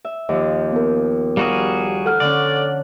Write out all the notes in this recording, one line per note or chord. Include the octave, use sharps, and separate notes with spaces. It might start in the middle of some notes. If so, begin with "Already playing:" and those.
E5
D#2 F3 D#5
B3 A#4
G3 F#4 G#4 F5 A#5
A4 F#5 F6
D3 C#4 D5